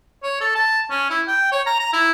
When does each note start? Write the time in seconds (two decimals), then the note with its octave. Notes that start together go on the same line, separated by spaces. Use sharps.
0.23 C#5
0.41 A4
0.55 A5
0.90 C#4
1.10 E4
1.27 G5
1.52 C#5
1.66 A#5
1.79 A#5
1.93 E4